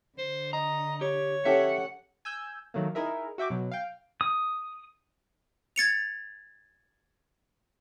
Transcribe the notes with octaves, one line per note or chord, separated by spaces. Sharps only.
D3 C5
D#5 A#5
G4 C#5
C#4 G4 A4 E5 F#5
G#5 E6 G6
D#3 F#3 A3 A#3
D#4 E4 G#4 A#4 E5
F#4 E5 G5 D6
B2 F#3
F5 G5
D#6
G#6 A6 C#7 F7